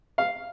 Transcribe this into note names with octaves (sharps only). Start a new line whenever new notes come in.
F5